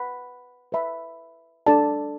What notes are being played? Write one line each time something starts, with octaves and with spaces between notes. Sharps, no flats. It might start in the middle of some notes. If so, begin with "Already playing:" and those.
Already playing: B4 F#5 B5
B4 E5 B5
D4 A4 D5 A5